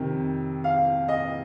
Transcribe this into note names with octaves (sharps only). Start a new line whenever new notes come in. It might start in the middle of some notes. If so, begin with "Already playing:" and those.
Already playing: F2 C3 D#3
F5
D#5